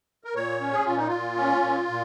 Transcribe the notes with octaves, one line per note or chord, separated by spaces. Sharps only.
A#4
A#2 C#5
C#4
G#4
A#2 F4
D#4
A#2 F4
C#4
A#2
A#2